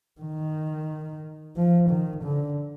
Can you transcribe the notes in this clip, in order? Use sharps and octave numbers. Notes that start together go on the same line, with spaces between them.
D#3
F3
D#3
D3